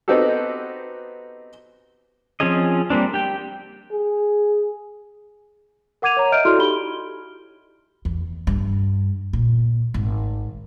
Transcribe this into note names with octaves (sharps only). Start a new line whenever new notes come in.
B3 C4 D#4 F#4 G4 A4
F3 C4 C#4 G#4 D#5
G3 A#3 C4 D4
G4 G5
G#4
A#4 F#5 D6 G#6 D#7 F7
C#5 A#5
D#5 E5 F6 G6 D7
E4 F#4 A4 D5 C6 F6
D#4 G4 B5 G7
E2
G2
A#2
G#1